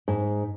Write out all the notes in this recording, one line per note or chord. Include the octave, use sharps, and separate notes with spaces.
G#2